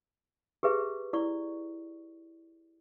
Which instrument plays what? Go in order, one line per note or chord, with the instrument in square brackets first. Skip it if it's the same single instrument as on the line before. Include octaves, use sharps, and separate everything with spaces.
[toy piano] G4 G#4 B4 E5
E4 D5 C#6